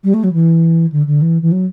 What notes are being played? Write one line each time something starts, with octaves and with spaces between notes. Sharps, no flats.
G3
A3
F#3
E3
D3
D3
E3
E3
F#3